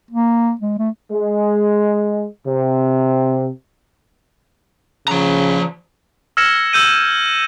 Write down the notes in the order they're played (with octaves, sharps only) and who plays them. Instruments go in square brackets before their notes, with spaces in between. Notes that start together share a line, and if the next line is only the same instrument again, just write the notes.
[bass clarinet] A#3
G#3
A3
[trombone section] G#3
C3
[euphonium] C#3 [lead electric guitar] F3 A#5
[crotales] E6 F6 G#6 A#6 C#7 E7
E6 G6 D#7